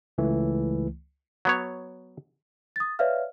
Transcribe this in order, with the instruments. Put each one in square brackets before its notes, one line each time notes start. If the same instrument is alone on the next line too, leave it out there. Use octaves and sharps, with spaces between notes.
[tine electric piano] C#2 E3 A3
[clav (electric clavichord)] F#3 B3 C#5
[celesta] D#6 A6
B4 C#5 D5 E5 F5 F6